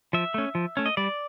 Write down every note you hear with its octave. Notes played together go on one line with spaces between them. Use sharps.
F3 E5
A3 C#4
F3
A3 C#4
D#5
G3 D5